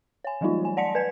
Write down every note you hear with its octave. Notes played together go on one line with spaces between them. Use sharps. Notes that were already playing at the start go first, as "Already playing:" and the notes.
C#5 G#5
E3 F#3 G3 A3 D#4 F4
G#5
D5 F#5 A5 C6 B6 C#7
B4 G#5 G#6